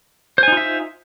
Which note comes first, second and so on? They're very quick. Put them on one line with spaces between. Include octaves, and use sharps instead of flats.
C5 G#5 D#4 F4 E5